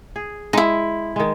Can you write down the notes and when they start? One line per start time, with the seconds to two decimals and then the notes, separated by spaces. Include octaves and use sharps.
0.16 G#4
0.53 G#3 D#4 E4
1.16 D#3 G#3